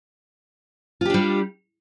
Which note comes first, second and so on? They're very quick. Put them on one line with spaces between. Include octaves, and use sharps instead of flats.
F4 G4 D4 G3